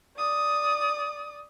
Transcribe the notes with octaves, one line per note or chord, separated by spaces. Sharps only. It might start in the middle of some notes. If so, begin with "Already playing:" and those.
D5 D#6